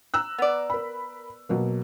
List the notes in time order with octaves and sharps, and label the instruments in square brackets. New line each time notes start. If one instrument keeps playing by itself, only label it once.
[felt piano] A#5 E6 F#6
[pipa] B3 D5
[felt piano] A#4 B5
B2 F#3 A#3